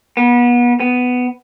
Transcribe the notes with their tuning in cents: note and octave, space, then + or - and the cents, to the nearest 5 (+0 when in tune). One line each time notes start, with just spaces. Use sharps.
B3 -30
B3 +10